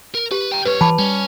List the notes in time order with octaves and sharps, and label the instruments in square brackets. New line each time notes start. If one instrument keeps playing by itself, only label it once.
[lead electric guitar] A#4
[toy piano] G4 [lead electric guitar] B4
[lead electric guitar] G5 A#5
[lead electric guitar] G2 C#5 [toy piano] B4
[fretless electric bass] E3 [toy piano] A5 B5 D6
[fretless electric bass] G3 [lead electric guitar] C#4